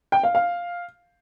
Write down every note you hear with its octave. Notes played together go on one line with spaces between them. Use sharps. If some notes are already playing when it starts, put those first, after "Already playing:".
G5
F5
F5